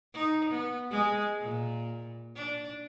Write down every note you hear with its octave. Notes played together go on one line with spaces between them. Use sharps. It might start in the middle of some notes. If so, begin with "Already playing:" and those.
D#4
B3
G#3
A#2
D4